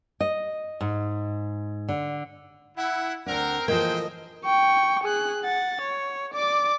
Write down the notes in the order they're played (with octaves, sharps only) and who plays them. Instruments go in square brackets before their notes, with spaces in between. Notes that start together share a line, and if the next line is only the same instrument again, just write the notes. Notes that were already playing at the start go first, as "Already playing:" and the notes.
[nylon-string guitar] D#5
G#2
D3
[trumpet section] E4 [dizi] F#5
[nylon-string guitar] D2 D4 [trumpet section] C4 A#4 [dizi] F#5
[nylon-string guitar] E3 F3 A4 [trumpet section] G#3 C5 G5 [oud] A#3 [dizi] D#5
[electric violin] G5 C#6
G#4 F#6
F#5 A6
C#5
D5 D6